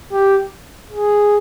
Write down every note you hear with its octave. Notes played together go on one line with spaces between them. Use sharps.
G4
G#4